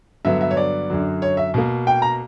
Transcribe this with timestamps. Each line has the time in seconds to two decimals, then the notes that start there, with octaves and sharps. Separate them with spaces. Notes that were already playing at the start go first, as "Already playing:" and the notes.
0.25 G2 D3 F#3 B3 E5
0.41 E5
0.51 C#5
0.57 D5
0.90 F#2 D3 F#3
1.22 C#5
1.37 E5
1.54 B2 A#3
1.87 G5
2.02 A#5